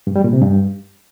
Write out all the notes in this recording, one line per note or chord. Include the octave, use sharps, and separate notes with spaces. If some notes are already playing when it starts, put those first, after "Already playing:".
G2
G3
A#2
C3
G2